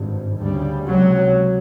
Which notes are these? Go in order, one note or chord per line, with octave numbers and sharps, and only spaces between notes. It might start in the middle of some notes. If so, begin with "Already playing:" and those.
Already playing: G#1 G2
D2 C#3 G3
C#2 C3 F#3